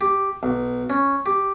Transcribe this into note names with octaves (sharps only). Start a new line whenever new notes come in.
G4
B1
C#4
G4